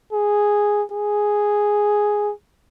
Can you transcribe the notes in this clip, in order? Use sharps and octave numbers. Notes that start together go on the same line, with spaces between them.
G#4
G#4